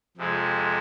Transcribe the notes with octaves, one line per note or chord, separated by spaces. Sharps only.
F2 C3 G#3